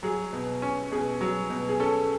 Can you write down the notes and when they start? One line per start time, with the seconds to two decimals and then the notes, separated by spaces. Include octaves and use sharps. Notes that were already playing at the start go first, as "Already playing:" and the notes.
0.03 F#3 G#4
0.33 B2
0.62 C#4
0.91 B2 G#4
1.21 F#3
1.50 B2
1.69 G#4
1.80 C#4 A4